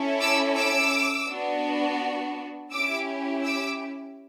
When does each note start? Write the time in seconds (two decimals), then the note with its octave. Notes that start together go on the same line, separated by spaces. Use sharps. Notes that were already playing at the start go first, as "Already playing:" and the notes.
Already playing: C#4 E4 A4
0.20 D6 E6
0.57 D6 E6
1.28 B3 D4 F#4
2.71 C#4 E4 G4 D6 E6
3.43 D6 E6